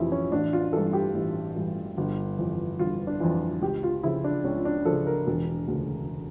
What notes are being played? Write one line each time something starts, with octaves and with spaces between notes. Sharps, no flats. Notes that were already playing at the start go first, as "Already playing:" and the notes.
Already playing: F1 F2 E3 E4 G4
C#4
A1 D4
F4
G2 E3 A4
G4
A1
G2 E3
G1
F2 E3
G1 F4
D4
F2 E3
C#2 G4
F4
C#3 F3 E4
D4
C#2 C#4
D4
C#3 F3 A4
A#4
E1
D2 C#3